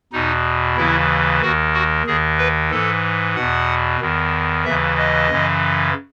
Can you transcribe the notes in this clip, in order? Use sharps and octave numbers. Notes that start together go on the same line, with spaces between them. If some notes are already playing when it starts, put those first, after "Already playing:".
E2 B2 D#4
D#2 C#3 E3 E4
D#2 D#3 F#4
F#4
D#2 D#3 G#4
B4
G#2 E3 A4
E2 B2 F#5
E2 D#3
D#2 C#3 E3 E5
D#5
F#2 C#3 E3